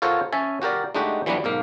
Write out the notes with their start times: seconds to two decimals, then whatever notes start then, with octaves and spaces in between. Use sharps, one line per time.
0.02 F4 F#4 A4 A#4 C5 C#5
0.33 C#4 E5 G#5 A5
0.62 F#4 G4 A#4 D5
0.95 G#3 A3 D4 D#4 F#4 G4
1.26 E3 F#3 G3 B3 D4
1.44 B1 G#2 A#3 F5